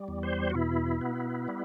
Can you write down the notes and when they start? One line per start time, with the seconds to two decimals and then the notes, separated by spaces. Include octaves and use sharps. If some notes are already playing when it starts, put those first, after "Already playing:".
Already playing: G3
0.08 E2
0.23 C5
0.50 F#4
0.54 B2 E4
1.01 B3
1.48 G3